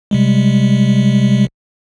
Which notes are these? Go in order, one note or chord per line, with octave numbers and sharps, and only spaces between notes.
C3 G3 G#3